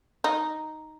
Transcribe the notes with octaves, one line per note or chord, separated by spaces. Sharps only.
D#4